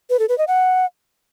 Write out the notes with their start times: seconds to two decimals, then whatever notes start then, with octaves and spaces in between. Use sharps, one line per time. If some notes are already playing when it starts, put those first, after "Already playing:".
0.10 B4
0.19 A4
0.29 B4
0.38 D#5
0.48 F#5